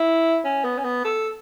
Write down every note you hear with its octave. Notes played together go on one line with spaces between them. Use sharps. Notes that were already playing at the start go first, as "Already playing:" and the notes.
Already playing: E4
C#4
B3
C#4
B3
A4